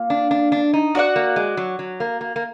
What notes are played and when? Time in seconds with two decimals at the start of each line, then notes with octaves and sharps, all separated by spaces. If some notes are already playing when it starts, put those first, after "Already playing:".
Already playing: A#3 F4
0.10 D4
0.31 D4
0.52 D4
0.74 D#4
0.95 F#4 D5 F#5
1.16 A#3
1.36 G#3
1.57 F#3
1.79 F#3
2.00 A#3
2.21 A#3
2.36 A#3